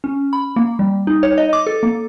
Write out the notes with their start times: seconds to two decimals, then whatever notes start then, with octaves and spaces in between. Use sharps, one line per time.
0.04 C#4
0.33 B5
0.56 A#3
0.79 G3
1.07 D#4
1.23 C#5
1.38 D#5
1.53 D6
1.67 A4
1.83 A#3